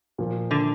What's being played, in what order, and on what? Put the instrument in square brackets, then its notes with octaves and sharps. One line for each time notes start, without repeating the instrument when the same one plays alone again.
[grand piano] A#2 F3 A#3
[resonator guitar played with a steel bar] D3